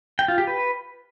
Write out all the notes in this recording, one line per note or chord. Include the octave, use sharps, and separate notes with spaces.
G5
F4
G4
B4